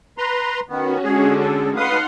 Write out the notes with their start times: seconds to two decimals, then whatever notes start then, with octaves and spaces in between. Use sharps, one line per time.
0.18 B4 A#5 C6
0.69 D#3 B3 C#4 F#4
1.04 D3 G#3 G#4
1.40 A4
1.77 D#4 B4 F5 F#5 A5 C6 D#6